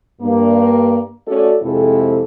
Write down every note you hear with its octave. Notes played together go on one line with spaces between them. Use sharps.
G2 A#3
A3 C#4 F#4 A4 D5
F2 C3 G#3 E4 A4